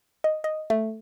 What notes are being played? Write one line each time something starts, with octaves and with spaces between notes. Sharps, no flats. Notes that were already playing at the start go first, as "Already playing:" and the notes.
D#5
D#5
A3